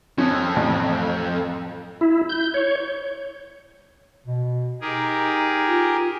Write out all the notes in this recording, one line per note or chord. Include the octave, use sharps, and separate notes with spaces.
F2 C#4
A1
E4
G6
C#5
B2
D#4 G4 G#4 A#4
F4